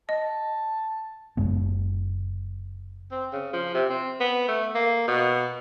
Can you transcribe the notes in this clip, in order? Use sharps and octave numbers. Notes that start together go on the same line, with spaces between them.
D#5 A5
F#1 F#2 G#3 B3
C4
C#3
F3
C3
C4
B3
A3
A#3
B2